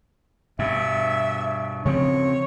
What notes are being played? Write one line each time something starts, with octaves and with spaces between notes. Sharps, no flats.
G2 B2 E5
C#3 F3 C4 C#5